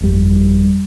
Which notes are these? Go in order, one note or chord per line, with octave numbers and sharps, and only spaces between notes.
G1 F2 G3